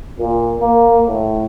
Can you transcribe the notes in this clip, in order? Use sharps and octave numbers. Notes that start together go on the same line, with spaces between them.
A#2
A#3
A2